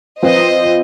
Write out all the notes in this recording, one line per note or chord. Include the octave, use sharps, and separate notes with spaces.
F3 C4 F4 B4 C5 D#5